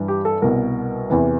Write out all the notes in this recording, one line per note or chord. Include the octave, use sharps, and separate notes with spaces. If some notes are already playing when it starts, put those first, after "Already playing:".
Already playing: G2 E3
G4
A4
C2 B2 A#4
E2 C3 E3